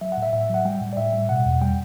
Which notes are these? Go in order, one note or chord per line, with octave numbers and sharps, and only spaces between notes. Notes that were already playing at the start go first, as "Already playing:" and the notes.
F#3 E5
F#5
A2
E5
A2 E5
F#3 F#5
G3 G5
A2
D5
A2 E5
G3
B2 F#5
E2
G3 G5